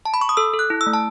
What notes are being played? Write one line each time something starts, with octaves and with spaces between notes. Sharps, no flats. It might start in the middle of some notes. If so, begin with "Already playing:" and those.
A5
B5
C#6
D#6
A4 E6
A4
F#6
E4
E6
A3
A5